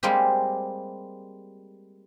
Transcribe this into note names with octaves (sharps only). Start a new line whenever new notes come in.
G3 G#3 A#3 C4 G4